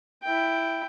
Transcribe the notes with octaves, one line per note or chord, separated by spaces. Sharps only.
E4 G5